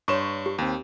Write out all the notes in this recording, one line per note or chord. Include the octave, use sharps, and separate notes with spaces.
G2 C#5 C6 C#6 E7
G4
D#2 C4